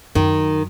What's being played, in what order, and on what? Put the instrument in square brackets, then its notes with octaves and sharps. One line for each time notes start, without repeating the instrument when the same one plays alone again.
[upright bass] F#2 [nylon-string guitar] D#3